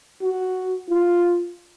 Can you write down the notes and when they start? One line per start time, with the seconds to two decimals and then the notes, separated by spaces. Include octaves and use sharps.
0.22 F#4
0.89 F4